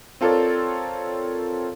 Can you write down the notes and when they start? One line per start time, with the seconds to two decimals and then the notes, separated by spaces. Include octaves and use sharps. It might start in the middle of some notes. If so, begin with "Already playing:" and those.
0.21 C4 F4 A4 A#4 C#5 D5